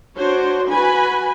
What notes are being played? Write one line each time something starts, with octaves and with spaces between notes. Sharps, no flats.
D4 F#4 C5 C#5
F#4 B4 G#5 B5